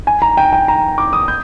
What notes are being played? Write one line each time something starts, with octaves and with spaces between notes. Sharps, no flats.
G#5
A#5
G5
G5
A#5
D6
D#6
G6